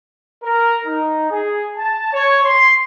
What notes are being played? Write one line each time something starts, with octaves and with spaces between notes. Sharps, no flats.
A#4
D#4
G#4
A5
C#5
C6